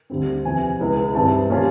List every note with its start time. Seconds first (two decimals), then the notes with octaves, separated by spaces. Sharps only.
0.10 D2 D3 G3 C4
0.45 E2 C3 F3 G#5
0.79 C#2 B2 G#3 B3 E4
1.15 G2 E3 G3 C4 A5
1.50 A#2 G3 A#3 C#4 F4